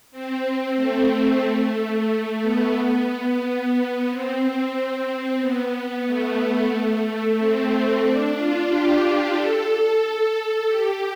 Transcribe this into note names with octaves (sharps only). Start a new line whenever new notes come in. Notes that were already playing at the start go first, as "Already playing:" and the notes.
C4
A3
A3
B3
C4
B3
A3
B3
A3
C4
D4
F4
G4
A4
A4
A4
G4